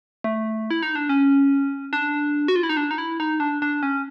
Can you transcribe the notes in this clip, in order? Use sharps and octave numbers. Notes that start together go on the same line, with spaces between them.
A3
E4
D#4
D4
C#4
D4
F#4
F4
E4
D#4
D4
D#4
E4
D#4
D4
D4
C#4